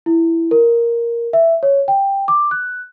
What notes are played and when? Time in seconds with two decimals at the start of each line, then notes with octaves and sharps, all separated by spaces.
0.06 E4
0.51 A#4
1.33 E5
1.63 C#5
1.88 G5
2.28 D6
2.51 F#6